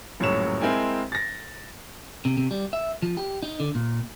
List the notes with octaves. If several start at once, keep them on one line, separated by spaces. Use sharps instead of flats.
D#1 F#2 A2 F#3 C#5 E7
G#3 C4 E4 A#4 G5 G#5
A6 A#6
C3
C3
G3
E5
F3
G4
D#4
D3
A#2